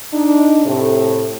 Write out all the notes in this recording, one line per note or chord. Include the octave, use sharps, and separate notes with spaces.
D4 D#4
A2 C3 A3